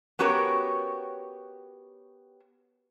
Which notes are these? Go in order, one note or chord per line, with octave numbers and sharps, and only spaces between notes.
B3 C#4 F#4 G4 A#4 C#5